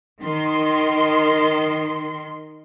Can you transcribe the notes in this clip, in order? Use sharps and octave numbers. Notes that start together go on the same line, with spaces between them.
D#3 C6